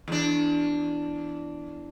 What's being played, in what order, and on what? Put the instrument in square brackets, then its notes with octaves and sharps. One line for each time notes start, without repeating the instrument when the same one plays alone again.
[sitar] E2 D4